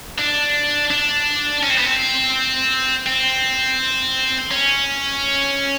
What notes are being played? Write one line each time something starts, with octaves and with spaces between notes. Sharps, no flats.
D4
D4
C#4
C4
B3
C4
C4
C#4